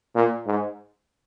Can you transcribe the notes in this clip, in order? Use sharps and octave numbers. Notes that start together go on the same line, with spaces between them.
A#2
G#2